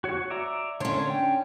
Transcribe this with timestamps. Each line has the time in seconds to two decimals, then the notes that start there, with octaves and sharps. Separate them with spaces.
0.04 F#4 C#5
0.30 D5 E5 A#5
0.80 D3 C#4 D4 C#5 C6
1.10 G5